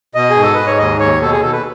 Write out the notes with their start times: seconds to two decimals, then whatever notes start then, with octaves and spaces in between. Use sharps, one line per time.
0.15 B2 D#5
0.30 G#4
0.36 G#2
0.43 A4
0.54 G#2 B4
0.66 C#5
0.78 D#2 D#5
1.00 D#2 C#5
1.21 B2 A4
1.31 G#4
1.42 B2 A4
1.52 B4